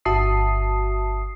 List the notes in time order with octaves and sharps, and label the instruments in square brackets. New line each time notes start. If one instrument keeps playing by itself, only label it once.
[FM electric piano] G1 F#4 E5 A5 D#6 C7